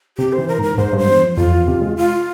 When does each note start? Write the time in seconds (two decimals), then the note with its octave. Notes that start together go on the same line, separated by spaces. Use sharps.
0.18 C3 G4
0.33 C5
0.38 E3
0.48 A#4
0.59 G#2 A#4
0.77 G#2 C5
0.93 G2
0.98 C5
1.08 E2
1.22 F2
1.37 F2 F4
1.52 E2
1.68 C3
1.82 G#3
1.97 F4